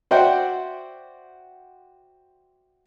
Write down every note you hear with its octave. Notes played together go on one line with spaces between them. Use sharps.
F#4 C5 D5 E5 F#5 G5